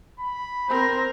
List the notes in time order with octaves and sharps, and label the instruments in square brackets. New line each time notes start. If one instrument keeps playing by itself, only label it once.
[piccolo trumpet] B5
[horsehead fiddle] C4 A#4 [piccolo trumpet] C5